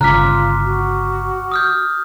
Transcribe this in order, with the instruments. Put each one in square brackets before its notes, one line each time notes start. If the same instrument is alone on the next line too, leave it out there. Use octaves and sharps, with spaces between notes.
[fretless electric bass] G1 C#3 [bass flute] F4 [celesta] A#5 B6 [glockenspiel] D6 F6 F#6
[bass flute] F#4
[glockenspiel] D#6 F6 G6